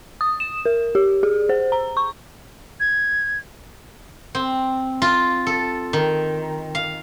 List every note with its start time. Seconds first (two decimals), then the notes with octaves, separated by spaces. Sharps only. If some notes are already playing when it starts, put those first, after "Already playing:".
0.21 D#6
0.40 E7
0.65 A#4
0.95 G4
1.23 G#4
1.49 C5
1.72 A#5
1.97 C#6
2.80 G#6
4.35 C4
5.02 F4
5.47 A4
5.93 D#3
6.75 F5